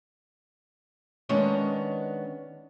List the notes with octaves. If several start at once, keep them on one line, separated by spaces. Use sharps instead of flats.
D#3 G#3 B3 C#4 D4